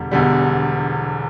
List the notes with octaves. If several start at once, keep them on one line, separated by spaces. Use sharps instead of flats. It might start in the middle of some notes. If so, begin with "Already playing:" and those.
Already playing: E1 E2 D3 G3
E1 E2 D3 G3